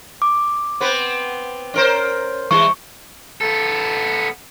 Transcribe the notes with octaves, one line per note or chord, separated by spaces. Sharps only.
D6
B3 C4 B4
C#4 A#4 C5
E3 G3 E4 C#6
B3 A4